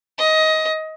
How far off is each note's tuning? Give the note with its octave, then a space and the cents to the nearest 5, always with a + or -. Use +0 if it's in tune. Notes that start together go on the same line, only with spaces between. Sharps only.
D#5 +20